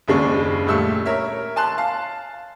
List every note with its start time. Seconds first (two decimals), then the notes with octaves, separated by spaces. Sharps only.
0.08 F#1 D#2 C#3 G#3 D4 C#6
0.66 C#2 A#2 G3 A3 E6
1.05 A#4 C#5 E5
1.56 G#5 A5 C6 F#6
1.78 F5 A5